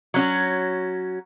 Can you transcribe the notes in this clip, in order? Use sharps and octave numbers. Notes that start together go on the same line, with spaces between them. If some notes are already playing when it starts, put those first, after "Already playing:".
F#3 C#4 F#4